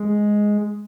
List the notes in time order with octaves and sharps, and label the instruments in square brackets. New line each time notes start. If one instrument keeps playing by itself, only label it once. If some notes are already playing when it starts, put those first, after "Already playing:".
Already playing: [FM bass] G#3